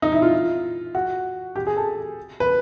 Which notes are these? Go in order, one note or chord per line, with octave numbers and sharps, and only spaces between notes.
D#4
E4
F4
F#4
G4
G#4
A4
B4